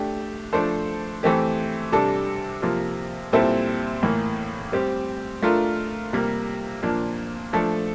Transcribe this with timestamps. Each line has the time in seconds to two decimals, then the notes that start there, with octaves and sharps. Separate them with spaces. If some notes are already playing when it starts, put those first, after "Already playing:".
Already playing: A3 D4 G4
0.53 F3 A3 D4 A4 C5
1.23 E3 A3 C4 G4
1.92 C3 G3 D4 A4
2.62 C3 F3 A#3 F4
3.33 A#2 G3 C4 E4 A4
4.03 A2 E3 A#3
4.72 G3 C4 G4
5.43 A3 D4 F4 A#4
6.13 C3 G3 A#3
6.82 A#2 F3 A#3 D4
7.53 F3 A3 D4 A4